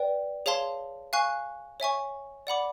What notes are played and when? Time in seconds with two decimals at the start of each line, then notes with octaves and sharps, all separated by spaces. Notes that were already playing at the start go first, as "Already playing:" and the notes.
Already playing: B4 D5 G5
0.46 G#4 C#5 F5 A5 C6
1.13 F5 G#5 C#6 F#6
1.80 C#5 E5 G#5 C#6
2.47 D5 F#5 B5 D6